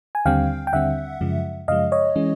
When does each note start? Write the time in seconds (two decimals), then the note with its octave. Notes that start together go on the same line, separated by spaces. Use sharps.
0.15 G#5
0.26 D#2 D3 G3 C4 F5 G5
0.67 G5
0.73 D#2 D3 G3 C4 E5 F#5
1.21 F#2 C#3 F3 G#3
1.68 F#2 C#3 F3 G#3 D#5 F5
1.92 C#5 D#5
2.16 E3 G#3 C#4